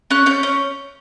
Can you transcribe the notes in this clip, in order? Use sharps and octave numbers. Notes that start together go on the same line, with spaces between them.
C#4 F#6
C#4 G6
C#4